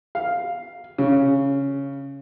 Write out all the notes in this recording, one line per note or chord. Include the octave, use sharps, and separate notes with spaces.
F5
C#3